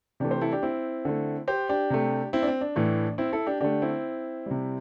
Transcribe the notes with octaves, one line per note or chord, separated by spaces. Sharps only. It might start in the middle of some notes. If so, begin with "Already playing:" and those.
C3 E3 A3 D4 G4
G4 C5
E4 A4
D4 G4
C4 E4
D3 A3
G4 C5
D4 G4
C3 A3
C4 E4
D4
C4
D4
A2 E3 A3
C4 E4
E4 A4
D4 G4
D3 A3 D4 G4
C4 E4
C3 G3